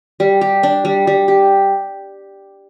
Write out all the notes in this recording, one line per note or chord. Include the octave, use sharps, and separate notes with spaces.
G3
G4
D4
G3
G3
G4